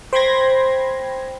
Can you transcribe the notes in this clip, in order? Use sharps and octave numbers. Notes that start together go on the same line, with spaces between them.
C5 G5 B5 C6 G#6 A#6